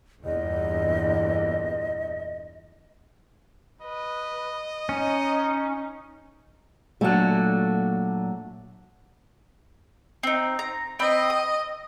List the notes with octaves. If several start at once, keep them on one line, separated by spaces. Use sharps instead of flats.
E2 G2 A#2 D#5
B4 D#5
C#4 D#4
A#2 F#3 A3 D4 F#4
C4 D#4
A#5
C4 D#5 G5 B5
D#6